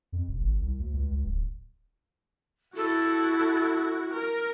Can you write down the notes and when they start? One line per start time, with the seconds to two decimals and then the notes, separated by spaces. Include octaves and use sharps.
0.12 F2
0.28 E1
0.41 G#1
0.61 C2
0.79 D2
0.93 C#2
1.11 C#2
1.25 D1
2.76 E4 F#4 A4
4.13 A#4